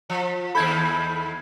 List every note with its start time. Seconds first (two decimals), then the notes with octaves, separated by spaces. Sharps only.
0.10 F3
0.55 D#2 E4 A4 B5 G6 G#6